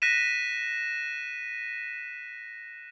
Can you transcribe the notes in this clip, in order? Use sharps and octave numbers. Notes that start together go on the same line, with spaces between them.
F#6 A#6 B6 D#7 E7